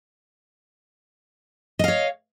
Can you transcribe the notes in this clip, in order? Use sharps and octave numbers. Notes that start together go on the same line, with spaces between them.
C#5 D#5 F5